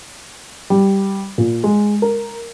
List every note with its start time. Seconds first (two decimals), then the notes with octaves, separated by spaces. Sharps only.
0.70 G3
1.38 A#2
1.64 G#3
2.02 A#4